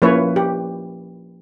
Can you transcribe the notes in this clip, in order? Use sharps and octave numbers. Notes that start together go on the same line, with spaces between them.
F3 A#3 C#4 E4 B4 C#5
G4